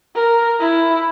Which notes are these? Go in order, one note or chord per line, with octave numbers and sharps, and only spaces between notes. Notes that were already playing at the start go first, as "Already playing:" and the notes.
A#4
E4